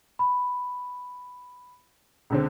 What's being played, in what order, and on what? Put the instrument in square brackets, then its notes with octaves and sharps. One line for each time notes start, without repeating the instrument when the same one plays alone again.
[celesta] B5
[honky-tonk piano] C#2 D3 C4